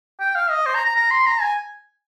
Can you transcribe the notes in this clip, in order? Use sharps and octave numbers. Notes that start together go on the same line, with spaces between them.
G5
F5
D#5
C5
A#5
A#5
A#5
C6
A#5
G#5